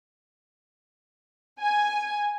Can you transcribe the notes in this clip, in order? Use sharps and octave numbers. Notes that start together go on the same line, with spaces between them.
G#5